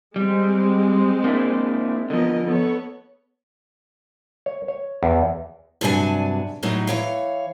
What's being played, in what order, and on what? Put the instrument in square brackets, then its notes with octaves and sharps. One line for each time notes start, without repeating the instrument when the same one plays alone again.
[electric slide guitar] G3 [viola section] G#3 C4
[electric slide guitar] A#3 D4 E4
[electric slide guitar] D3 F3 [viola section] B3 A#4 D#5
[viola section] B3 A4 C#5
[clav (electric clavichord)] C#5
C#5
E2
[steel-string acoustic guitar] G2 C3 F#3 D4 G#5
A2 F#3 G3 D#4
E3 C#5 F5